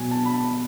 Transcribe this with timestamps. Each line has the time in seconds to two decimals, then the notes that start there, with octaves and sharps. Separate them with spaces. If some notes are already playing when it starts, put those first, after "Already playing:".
Already playing: B2 F#3 G#5
0.11 A5
0.26 B5
0.33 A5